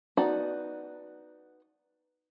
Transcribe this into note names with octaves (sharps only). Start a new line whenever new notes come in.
B3 D#4 F#4 D5 A5